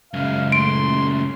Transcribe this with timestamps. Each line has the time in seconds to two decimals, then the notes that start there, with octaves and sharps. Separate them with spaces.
0.14 C#2 F#2 F5
0.52 A3 C6 D7